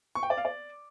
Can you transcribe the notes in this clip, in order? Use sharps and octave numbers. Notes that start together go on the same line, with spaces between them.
C#6
G5
D5
F5
D5